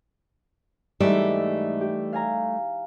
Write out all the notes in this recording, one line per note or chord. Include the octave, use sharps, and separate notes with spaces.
G#2 E3 G3 A3 D#4 D5
G4
F5 G#5 A#5